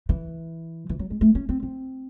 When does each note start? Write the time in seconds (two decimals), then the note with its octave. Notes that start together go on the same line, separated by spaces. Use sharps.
0.09 E3
0.89 E3
0.99 F#3
1.10 G#3
1.21 A3
1.35 C#4
1.49 C4
1.63 C4